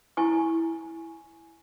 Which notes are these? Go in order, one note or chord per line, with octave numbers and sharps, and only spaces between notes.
E4 G#5 C#6